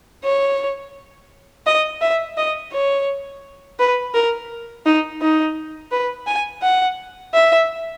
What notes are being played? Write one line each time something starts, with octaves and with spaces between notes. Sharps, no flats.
C#5
D#5
E5
D#5
C#5
B4
A#4
D#4
D#4
B4
G#5
F#5
E5